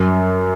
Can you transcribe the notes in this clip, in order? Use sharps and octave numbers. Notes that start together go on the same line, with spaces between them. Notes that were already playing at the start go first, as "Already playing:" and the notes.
Already playing: F#2